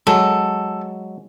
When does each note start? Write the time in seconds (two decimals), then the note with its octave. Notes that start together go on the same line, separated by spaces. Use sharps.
0.07 F#3 G#3 A4